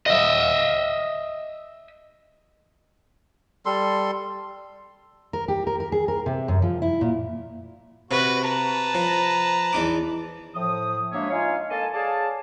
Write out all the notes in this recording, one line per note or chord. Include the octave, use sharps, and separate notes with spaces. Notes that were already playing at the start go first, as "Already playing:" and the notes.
D#5 E5
G3 A4 C6
A#4
G4
A#4
A#4
G#4
A#4
C3
F#2
F3
E4
A#2
C3 F#4 B4 C#6
B4 A5 A#5
F3
E2 D#4 D6
A2 F3 D#6
F#3 G#3 A#3 D4 C#5 E5
D#4 F4 C#5 F5 G#5
A#3 A4 D#5 G#5 A5
G#4 C#5 D5 F5 G#5 A5